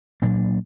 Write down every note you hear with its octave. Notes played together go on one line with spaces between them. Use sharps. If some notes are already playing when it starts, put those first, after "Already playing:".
A#2 F#3 A#3 D4